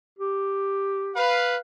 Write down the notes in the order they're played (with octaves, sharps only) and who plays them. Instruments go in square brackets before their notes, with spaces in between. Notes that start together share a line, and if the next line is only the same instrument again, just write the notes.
[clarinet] G4
[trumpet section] B4 F5